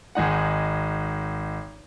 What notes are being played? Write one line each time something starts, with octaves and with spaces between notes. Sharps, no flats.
G#1 G#3 D#4 F#5